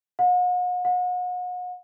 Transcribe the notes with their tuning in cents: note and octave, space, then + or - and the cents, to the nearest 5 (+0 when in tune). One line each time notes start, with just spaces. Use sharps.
F#5 -45
F#5 -40